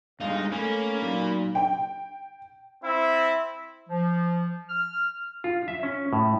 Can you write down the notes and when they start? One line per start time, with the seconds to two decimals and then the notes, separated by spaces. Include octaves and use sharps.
0.20 G1 G2 G#3 D#4 F5
0.52 A3 A#3 C#4 A4 B5
1.02 A#2 F#3 D#4
1.55 G5
2.84 C4 E4 E5
3.89 F3
4.69 F6
5.44 F4
5.68 E5
5.83 C#4
6.13 A2